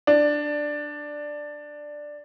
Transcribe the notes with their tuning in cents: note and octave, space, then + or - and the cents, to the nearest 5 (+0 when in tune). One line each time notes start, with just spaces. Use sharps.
D4 +5